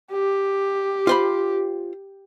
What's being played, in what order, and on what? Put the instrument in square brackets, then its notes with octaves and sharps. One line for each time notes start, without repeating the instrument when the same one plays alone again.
[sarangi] G4
[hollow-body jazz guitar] F4 C5 B5